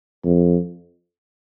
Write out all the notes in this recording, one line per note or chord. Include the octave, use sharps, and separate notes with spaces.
F2